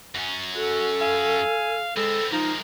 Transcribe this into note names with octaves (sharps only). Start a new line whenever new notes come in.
F#2 C#4
F#4 A4
F5 G#5
G#3 B3 C4 A4
F3 G#3 A#3 D#4